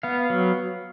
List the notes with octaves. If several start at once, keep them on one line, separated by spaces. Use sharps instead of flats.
B3 F5
F#3